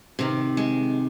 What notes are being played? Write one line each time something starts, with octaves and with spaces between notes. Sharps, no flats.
C3 D#3
G#3